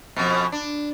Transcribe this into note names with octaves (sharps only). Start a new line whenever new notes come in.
F2 B2
D4